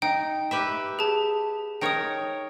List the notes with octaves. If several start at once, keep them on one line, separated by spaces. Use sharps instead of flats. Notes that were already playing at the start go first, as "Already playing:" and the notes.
D#4 G5
G4 B4 E5
G#4 A5
D#4 A#4 C#5 G5 D#6